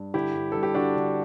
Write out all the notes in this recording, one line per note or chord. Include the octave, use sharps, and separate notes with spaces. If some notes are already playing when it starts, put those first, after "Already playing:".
Already playing: G2
D3 E4 G4
G2
G2 A4
G4
D3 D4 F#4
D3